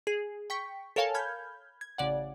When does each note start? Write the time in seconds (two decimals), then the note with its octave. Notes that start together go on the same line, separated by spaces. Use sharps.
0.07 G#4
0.50 G5 C#6 B6
0.96 A4 A#4 C#5 F5 G#5 A5
1.14 B5 F6 G6 G#6
1.81 G#6
1.98 A1 C#3 D5 F#5